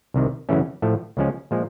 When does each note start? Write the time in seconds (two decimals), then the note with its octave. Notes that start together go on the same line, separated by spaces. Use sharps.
0.14 C2 C3 D#3
0.49 F#2 C#3 E3 A3 C#4
0.82 A2 F3 A3
1.17 C#2 C#3 F3 G#3 C#4
1.51 A#2 F3 G#3